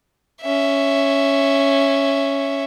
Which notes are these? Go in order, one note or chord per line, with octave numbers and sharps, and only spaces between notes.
C#4 E5